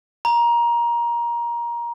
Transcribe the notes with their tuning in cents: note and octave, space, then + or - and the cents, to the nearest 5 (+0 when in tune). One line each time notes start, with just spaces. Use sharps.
A#5 +20